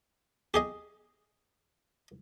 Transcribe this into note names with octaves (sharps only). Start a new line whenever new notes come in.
G4 G#4 D#5